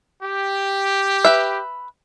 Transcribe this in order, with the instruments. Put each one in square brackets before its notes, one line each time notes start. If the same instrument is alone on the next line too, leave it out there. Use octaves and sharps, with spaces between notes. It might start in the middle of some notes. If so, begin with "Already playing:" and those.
[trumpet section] G4
[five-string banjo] B4 E5